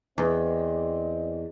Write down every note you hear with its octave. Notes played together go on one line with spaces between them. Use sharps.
E2 C4 D5 D#5